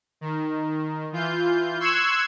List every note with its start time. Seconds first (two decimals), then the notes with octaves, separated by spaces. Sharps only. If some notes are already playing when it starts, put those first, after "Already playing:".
0.21 D#3
1.12 E3 F4 G6
1.79 C6 C#6 E6 F#6 G#6